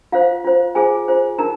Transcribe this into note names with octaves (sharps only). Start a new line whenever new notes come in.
F4 C5 F5
F4 C5
F4 G#4 C5 G#5
F4 C5
D#4 A#4 A#5